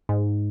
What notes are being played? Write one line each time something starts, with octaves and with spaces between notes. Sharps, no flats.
G#2